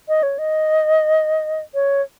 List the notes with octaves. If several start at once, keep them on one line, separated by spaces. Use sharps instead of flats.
D#5
C#5
D#5
C#5